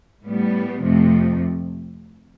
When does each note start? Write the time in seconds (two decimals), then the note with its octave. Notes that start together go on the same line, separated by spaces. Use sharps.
0.23 A2 G3 B3
0.81 F2 C3 F3 A3